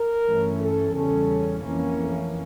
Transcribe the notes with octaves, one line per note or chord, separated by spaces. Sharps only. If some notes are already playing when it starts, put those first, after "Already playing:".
Already playing: A#4
G2 E3 A3 C#4
A4
E2 C#3 G3 C#4 A4
F2 E3 A#3 C#4
A3